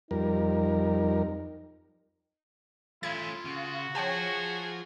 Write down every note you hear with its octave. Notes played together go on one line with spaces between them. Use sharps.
F2 G3 D#4 A#4
A3 C#4 E4 F4 G#6
C#3 F#4
F4 G#4 C5 C#5 G5 A5